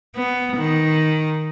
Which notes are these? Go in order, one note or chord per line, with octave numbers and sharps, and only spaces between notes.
B3
D#3